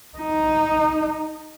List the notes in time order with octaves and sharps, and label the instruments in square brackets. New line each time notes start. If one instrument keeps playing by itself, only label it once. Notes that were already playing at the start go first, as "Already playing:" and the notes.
[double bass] D#4